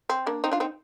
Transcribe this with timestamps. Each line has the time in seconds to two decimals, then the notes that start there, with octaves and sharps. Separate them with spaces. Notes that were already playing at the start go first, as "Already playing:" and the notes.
0.09 C4
0.26 A#3 D4
0.44 C4 D#4
0.51 D4 F4
0.60 C4 D#4